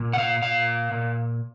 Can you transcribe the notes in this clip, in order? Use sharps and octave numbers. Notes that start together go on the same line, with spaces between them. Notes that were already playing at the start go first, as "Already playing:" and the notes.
Already playing: A#2
F#5
F5
A#2 F5
A#2